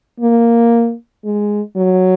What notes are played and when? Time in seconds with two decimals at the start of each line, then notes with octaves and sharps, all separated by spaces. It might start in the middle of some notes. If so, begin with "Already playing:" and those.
0.21 A#3
1.25 G#3
1.76 F#3